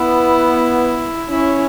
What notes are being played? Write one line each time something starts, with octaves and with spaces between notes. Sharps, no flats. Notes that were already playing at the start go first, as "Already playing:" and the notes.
Already playing: B3 E4
C#4 E4